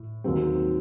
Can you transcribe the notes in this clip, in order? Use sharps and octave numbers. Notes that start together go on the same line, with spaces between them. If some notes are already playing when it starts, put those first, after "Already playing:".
Already playing: A2
D#2 D#3 F#3 C4